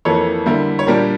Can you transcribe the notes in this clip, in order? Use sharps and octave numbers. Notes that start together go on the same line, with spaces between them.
F2 E3 A#3 A4 C#5
D3 G3 A#3 E4
C#5
A#2 G3 D4 G4 A#4